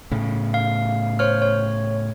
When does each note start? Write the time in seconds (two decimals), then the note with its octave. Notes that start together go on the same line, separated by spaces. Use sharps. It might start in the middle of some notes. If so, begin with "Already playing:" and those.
0.11 A2 C#3
0.54 F5
1.19 C5 C#5 F6
1.42 C#5